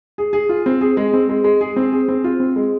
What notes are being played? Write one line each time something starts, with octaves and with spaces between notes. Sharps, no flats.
G#4
G#4
F4
C4
G#4
G#3
C4
G#3
G#3
G#4
C4
G#4
C4
F4
C4
G#3